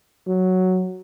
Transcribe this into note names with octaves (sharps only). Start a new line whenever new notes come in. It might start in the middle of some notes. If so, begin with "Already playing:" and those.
F#3